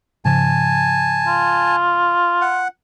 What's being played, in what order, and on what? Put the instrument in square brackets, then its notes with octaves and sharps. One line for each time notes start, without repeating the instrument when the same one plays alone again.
[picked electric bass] G#2 C#3 F3 [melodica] G#5 A5
[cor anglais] F4
[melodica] F#5